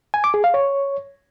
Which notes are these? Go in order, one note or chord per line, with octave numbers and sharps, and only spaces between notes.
G#5
D6
G#4
F5
C#5